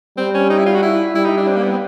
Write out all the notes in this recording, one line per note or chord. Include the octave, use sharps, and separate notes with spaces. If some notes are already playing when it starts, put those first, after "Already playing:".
G3 C4
C#4
D#4
E4
F4
F#4
E4
G3 E4
D#4
D4
C4
A#3
B3
C4